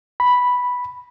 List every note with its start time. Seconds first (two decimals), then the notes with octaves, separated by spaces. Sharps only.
0.20 B5